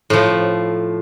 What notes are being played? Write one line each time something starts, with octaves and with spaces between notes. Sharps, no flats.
A2 F3